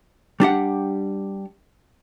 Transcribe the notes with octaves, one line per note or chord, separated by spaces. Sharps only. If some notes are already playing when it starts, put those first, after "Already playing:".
G3 D4 G4 F#5